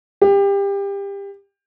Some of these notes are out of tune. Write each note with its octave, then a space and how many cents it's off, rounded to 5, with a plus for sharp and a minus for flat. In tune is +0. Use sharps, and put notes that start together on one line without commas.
G4 +25